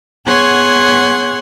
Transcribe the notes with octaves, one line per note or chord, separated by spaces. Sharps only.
B3 G#4 C#5 F#5 C6 G#6